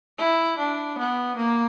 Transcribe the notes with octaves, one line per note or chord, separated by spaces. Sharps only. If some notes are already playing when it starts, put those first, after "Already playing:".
E4
D4
B3
A#3